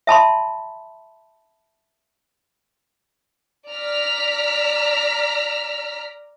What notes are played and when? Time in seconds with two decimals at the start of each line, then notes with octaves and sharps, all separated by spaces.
0.07 E5 A5 B5 C6
3.69 D5 A#5 F6 B6